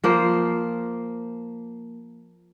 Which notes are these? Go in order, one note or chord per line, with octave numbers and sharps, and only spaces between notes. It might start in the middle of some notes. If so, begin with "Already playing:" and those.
F3 A#3 C5